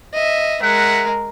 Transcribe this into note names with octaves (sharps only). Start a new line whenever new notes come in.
D#5 E5
G#3 A#4 E5 F#5